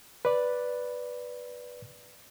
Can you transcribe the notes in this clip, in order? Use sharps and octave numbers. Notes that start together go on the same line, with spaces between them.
B4 D5